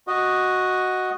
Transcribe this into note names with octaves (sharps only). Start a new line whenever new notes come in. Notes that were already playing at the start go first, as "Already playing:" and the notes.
F#4 D#5